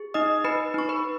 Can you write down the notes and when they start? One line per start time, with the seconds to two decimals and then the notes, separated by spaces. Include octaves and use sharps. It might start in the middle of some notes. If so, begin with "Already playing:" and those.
Already playing: G#4
0.14 D#4 D#5 D#6
0.44 D#4 B4 B5
0.74 D#4 C#6
0.89 B4 B5